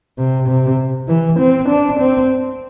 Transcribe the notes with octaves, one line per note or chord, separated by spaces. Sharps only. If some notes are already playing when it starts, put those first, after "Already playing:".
C3
C3
E3
C4
D4
C4